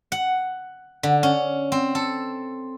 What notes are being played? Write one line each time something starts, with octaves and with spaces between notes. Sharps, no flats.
F#5
D3
C#4
C4
A4